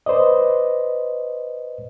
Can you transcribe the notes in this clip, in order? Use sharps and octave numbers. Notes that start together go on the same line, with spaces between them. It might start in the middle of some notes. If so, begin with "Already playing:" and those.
B4 C5 D5 D#5